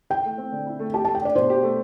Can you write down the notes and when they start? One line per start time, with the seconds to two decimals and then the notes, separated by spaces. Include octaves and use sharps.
0.10 E4 G5
0.25 A3
0.38 C4
0.52 D3
0.66 E4
0.79 A3
0.94 G4 A5
1.05 A3 A5
1.15 G5
1.22 D4 D5
1.36 B2 C5
1.50 G4
1.63 A3